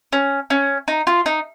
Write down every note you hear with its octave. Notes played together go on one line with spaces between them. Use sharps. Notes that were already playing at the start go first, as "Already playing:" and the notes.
C#4
C#4
D#4
F4
D#4